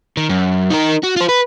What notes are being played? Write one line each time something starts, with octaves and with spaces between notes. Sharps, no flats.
D#3
F#2
D#4 A#4
F#4
F4 C5
B4